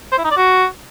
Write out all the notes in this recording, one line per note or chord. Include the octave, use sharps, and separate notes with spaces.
C5
E4
D#4
D5
F#4